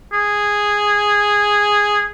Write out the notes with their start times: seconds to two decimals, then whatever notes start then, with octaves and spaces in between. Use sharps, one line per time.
0.13 G#4